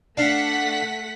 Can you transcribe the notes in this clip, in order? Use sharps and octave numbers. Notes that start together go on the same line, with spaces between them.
A3 D4 F5 F#5 B6